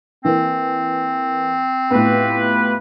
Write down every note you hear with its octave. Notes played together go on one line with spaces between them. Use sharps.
E3 A#3 C4
A2 B3 F4 G4 B4